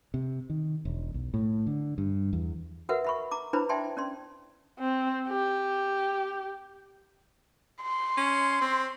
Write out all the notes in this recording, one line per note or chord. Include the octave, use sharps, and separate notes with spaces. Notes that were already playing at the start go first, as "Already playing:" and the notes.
C3
D#3
E1
B1
A2
D3
G2
E2
F#4 A#4 B4 E5 F#5
E5 B5 C#6
A#5 D6
D4 E4 B4 C5 A#5 B5
D5 E5 G5 A5 C6
C#4 D5 C6
C4
G4
C6
C#4
C4